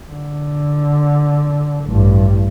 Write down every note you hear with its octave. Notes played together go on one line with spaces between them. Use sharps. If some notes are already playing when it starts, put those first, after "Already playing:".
D3
A1 G2